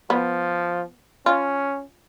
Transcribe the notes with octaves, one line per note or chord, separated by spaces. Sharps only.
F3 B3
C#4 F4